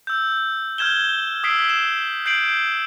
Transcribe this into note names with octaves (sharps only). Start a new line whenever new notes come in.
E6 G6
F6 G6 G#6 E7 G7
D#6 E6 B6 C7 D7
E7
G6 C7 D7 F#7